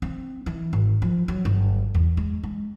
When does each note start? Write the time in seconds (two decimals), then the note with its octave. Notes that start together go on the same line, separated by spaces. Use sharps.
0.02 C4
0.46 E3
0.73 G#1
1.02 F3
1.28 F#3
1.45 G1
1.95 E2
2.17 G#3
2.43 G#3